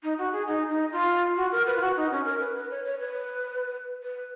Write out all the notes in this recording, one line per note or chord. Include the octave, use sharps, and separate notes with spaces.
D#4
F#4
G#4
D#4
D#4
F4
F#4
A#4
B4
F4
F#4
D#4
C#4
A#4
B4
B4
C#5
C#5
B4
B4